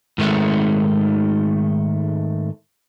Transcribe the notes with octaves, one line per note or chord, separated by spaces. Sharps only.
G#2 D#3 G#3 A3